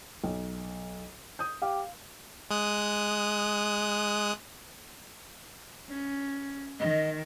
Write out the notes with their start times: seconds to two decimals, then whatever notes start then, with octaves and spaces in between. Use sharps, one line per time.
0.24 B1
1.39 D#6 G6
1.62 G4 F5
2.51 G#3 D#6 F#6
5.90 C#4
6.80 D#3 D#5